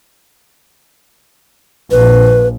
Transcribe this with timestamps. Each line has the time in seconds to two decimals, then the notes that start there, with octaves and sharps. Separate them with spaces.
1.91 A#1 A#2 F3 B4